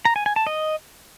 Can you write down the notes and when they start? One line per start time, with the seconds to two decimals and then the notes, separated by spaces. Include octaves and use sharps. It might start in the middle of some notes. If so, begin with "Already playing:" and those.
0.05 A#5
0.16 G#5
0.26 G#5
0.36 A5
0.47 D#5